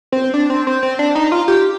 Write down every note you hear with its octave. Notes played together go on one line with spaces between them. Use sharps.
C4
D4
C4
C4
C4
D4
D#4
F4
G4